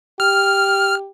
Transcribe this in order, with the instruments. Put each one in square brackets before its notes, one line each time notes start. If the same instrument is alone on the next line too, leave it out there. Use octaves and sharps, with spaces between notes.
[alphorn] G4 [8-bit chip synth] F6